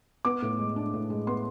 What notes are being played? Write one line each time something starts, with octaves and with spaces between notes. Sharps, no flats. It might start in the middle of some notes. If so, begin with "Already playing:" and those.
B3 D6
A2
G#3
D4
A2
G#3
B3 C6